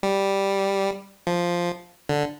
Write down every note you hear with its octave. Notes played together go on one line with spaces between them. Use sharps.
G3
F3
D3